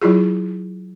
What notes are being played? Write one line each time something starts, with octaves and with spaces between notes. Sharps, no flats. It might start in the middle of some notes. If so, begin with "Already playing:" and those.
F#3 E4 F4 G#4